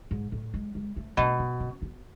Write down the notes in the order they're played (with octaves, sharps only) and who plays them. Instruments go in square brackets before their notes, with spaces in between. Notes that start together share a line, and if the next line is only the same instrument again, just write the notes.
[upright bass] G#2
A2
G#3
G#3
A3
[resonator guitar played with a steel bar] B2 [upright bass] A3
[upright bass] B3
C#4
B3